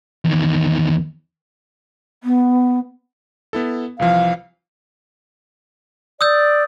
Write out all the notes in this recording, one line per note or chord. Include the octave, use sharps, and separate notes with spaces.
E2 D#3
B3
B3 E4 A4
C2 E3 F3 F5
D5 D#6 E6 G6